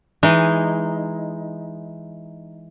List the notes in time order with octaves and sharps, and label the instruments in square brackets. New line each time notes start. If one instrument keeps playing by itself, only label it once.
[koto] E3 G#3 D#4